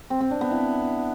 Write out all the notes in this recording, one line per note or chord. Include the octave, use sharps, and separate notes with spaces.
C4
C4
D4
B3
E4